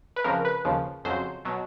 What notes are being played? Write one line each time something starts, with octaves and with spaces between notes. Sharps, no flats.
B4
F2 C#3 F3 A#4
B4
D#2 C#3 F3
F2 C#3 F#3 C5
B2 F#3